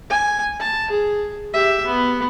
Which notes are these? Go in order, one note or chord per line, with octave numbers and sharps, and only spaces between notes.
G#5
A5
G#4
G4 E5
B3